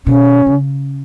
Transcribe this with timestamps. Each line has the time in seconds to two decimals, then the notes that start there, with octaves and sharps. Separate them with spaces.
0.06 B2 C#4
0.47 C#3